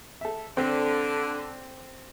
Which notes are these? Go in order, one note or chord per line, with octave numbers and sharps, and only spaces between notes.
A4 E5
D3 C4